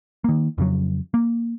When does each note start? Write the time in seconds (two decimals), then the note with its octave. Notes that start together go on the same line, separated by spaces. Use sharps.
0.24 D#3 A#3
0.58 F2 C#3 F#3
1.14 A#3